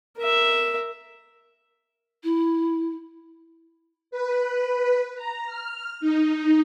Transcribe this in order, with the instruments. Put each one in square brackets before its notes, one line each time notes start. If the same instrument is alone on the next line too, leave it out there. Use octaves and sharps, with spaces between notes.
[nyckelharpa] A#4 E5
[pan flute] E4
[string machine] B4
A#5
F6
D#4